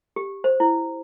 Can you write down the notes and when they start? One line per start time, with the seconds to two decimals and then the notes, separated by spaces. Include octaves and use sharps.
0.16 G4
0.44 C5
0.60 E4